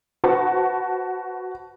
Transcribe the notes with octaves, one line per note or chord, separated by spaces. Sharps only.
F#4 B4 C5 A5 C#6